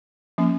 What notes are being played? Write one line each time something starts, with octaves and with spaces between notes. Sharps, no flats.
F3 A#3 C#4